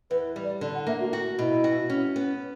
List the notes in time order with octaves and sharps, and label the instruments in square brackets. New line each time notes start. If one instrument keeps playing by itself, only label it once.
[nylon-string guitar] E2 [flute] B4
[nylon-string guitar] G3
[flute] D5
[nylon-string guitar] D3 [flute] D5
[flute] F#5
[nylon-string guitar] A#3 [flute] E5
[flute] F#4
[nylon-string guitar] F#4
[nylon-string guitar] B2 [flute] E4
[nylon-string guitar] F#4
C#4
B3